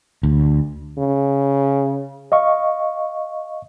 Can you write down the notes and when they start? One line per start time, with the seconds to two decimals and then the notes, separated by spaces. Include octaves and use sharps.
0.23 D2
0.98 C#3
2.32 D#5 F5 C#6